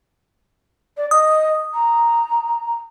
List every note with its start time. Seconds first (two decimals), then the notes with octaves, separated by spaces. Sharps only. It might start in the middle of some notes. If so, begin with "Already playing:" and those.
0.97 D5
1.11 D#5 D#6
1.74 A#5